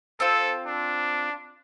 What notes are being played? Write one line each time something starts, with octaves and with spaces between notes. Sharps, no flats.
C4 F4 A4
D4